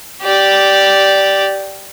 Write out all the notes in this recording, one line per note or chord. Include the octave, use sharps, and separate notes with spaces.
G4 D5